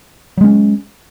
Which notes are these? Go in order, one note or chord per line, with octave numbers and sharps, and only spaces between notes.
F#3 G#3 C#4